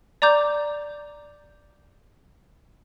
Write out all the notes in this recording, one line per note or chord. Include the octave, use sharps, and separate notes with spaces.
D5 A#5 D6 G6